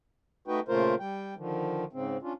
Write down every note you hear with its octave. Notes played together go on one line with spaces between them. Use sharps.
A3 D#4 F#4 B4 G5
A#2 C#3 A3 F4 A#4 C5
G3 G5
D3 D#3 F3
G#2 C#3 C4
C#4 D4 F4